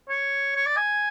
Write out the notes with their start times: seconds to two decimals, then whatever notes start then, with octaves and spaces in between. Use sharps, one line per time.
0.09 C#5
0.56 C#5
0.66 D5
0.76 G#5